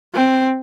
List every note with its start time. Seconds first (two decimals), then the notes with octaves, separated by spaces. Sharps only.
0.14 C4